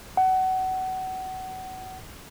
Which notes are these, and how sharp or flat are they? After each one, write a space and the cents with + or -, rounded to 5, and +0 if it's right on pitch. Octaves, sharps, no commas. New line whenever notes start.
F#5 +25